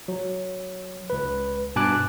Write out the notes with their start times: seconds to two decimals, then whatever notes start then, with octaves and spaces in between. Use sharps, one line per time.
0.08 F#3
1.10 C#2 B4
1.76 G2 B2 G#5 A5 D6 F#6